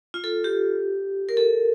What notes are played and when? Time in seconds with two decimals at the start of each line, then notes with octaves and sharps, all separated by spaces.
0.14 F4
0.24 A4
0.44 G4
1.29 A#4
1.37 A4